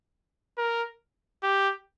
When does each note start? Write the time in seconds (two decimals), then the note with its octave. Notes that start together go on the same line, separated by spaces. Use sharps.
0.58 A#4
1.43 G4